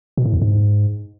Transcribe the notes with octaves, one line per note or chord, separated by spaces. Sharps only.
B2
A2
E2
G#2